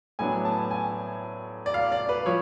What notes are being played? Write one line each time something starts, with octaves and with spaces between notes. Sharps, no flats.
A2 F#3 B3 D4 G#5
A5
G#5
D5
F5
D5
B4
F3 C#5